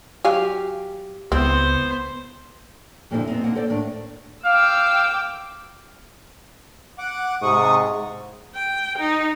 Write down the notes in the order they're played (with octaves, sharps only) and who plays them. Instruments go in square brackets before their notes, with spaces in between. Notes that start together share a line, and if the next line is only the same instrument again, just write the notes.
[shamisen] F#3 F5 G#5 [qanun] G4
[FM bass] C#2 [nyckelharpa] B3 C5 [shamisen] C4 E4
[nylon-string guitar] F2 A#2 D3 G3 C4 E4
B3 C4 D#4
D3 A#3 F#5
A4 C5 D5
A2 D#3 D4
[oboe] F5 [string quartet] G5 D6 E6
[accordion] F#5 D6
[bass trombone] G#2 [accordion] C3 C#6 D#6
[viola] G5
D#4